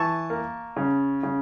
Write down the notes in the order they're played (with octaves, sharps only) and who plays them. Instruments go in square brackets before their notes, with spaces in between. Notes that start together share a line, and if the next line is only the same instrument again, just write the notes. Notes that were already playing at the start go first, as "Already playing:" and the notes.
Already playing: [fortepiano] E3 A5 C#6
A#3
C#3
C#3